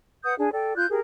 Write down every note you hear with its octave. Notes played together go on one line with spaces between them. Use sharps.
B4 F#5 D#6 G6
D4 G#4
A4 D5 G5
F4 F#6 G6
G4 G#4 A#4